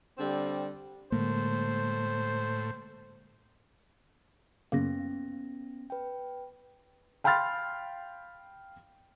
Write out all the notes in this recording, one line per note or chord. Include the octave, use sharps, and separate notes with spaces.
D3 G3 C4
A2 D3 G#3 A#3 C5
F#2 C#3 A#3 B3 C#4 A#6
B4 G5
F5 G5 B5 C6 F6 A6